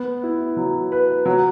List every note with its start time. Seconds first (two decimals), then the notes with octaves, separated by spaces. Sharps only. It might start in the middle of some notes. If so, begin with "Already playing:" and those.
Already playing: B3
0.23 E4
0.57 F#3
0.92 B4
1.25 F#3